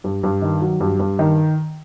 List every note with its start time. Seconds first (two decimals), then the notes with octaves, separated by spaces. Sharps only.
0.04 G2
0.23 G2
0.42 D#3
0.61 F#3
0.80 G2
0.99 G2
1.19 D#3